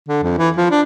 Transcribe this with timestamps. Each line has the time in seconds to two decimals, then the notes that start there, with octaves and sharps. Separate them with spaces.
0.08 D3
0.23 F2
0.37 E3
0.57 F3
0.70 D4